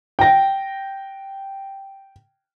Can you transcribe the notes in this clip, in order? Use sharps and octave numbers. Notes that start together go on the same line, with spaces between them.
G5 A#6